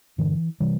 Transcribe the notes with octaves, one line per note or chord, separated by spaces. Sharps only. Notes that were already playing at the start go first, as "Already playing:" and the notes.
G2 D3 E3
C3 E3 G3